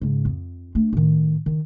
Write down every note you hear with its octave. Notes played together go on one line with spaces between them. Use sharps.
G#2 C#3
F2
A3 D4
A2 D#3
D#3